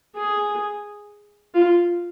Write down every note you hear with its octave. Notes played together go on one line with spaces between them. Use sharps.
G#4
F4